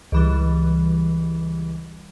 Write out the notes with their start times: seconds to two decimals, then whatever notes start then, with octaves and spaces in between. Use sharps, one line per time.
0.12 C#2 E3 G3